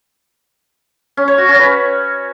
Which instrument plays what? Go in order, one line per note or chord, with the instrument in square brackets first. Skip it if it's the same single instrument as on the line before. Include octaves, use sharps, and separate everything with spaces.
[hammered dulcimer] C#4
C#5
F#4
C#4
B4